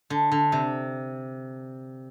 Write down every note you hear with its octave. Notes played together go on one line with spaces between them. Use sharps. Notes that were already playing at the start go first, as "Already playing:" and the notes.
D3
D3
C3